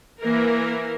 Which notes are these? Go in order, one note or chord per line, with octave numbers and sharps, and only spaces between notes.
E3 A#3 A#4